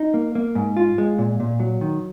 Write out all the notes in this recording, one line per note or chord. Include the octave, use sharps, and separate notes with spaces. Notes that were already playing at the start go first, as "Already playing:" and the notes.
Already playing: D#4
A#3
A#3
G#2
F4
G#3
A#2
A#2
F#3
D#3